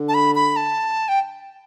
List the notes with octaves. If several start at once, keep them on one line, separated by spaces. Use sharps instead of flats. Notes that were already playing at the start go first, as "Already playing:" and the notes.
Already playing: D3
A5
B5
B5
A5
G5